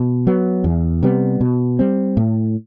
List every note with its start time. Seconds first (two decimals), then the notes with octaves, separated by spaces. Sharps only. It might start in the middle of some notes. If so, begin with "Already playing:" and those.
Already playing: B2
0.27 F#3 B3
0.64 E2
1.03 C3 G3 B3
1.41 B2
1.79 G3 C4
2.17 A2